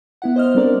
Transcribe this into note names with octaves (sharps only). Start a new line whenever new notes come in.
B3 E4 F#5
C5 D#5 F6
G3 C4 D4 A#4 D5